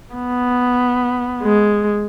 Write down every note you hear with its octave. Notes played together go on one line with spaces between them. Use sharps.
B3
G#3